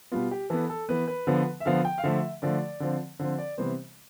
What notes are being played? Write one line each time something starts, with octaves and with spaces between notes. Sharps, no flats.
B2 G3 B3 F4
G4
E3 B3 A4
A4
E3 B3 B4
B4
D3 F3 B3
E5
D3 F3 B3 F5
G5
F5
D3 F3 A3 E5
D3 F3 A3 D5
D3 F3 C4
D3 F3 C4 C5
D5
C3 E3 G3 B3 C5